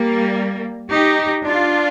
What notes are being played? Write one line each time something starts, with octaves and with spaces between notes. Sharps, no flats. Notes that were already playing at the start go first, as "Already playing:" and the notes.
Already playing: G3 A#3
D#4 G4
D4 F4